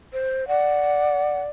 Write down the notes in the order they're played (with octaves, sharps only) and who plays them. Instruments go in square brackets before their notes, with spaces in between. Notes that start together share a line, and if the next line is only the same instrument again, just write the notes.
[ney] C5
[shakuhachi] D5 [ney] F#5